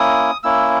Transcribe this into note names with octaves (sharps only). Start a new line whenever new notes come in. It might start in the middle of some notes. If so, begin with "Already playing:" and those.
Already playing: A#3 C#4 E4 D#6
A#3 C#4 E4 E6